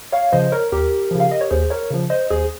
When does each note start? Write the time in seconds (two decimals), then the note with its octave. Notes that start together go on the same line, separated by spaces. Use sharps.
0.12 C#5 F5
0.32 C#3 F3 C5 D#5
0.52 A#4 C#5
0.72 D#2 G4 A#4
1.11 C#3 F3
1.20 F5
1.31 D#5
1.41 C#5
1.51 D#2 G#4 C5
1.70 A#4 C#5
1.90 C#3 F3
2.10 C5 D#5
2.30 D#2 G#4 C5